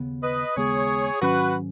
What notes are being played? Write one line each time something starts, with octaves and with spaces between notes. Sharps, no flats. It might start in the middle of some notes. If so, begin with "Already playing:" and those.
Already playing: D#2 C#3 B3
B4 D#5
D#2 C#3 G#3 B3 G#4 C#5
G#2 D#3 F#3 C#4 F#4 B4